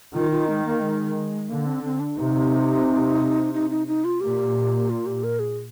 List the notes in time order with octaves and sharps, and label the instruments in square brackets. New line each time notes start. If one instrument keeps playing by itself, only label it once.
[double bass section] D#3 [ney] F4
[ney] F4
G#3
A#3
G#3
[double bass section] D3 [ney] A#3
[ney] C4
C4
D4
[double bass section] C3 [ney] D#4
[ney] D#4
D#4
D#4
F4
[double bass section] A#2 [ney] G4
[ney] F4
G4
A#4
G#4